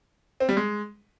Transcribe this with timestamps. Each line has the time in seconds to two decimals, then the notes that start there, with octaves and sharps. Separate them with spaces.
0.40 C4
0.49 G3
0.57 G#3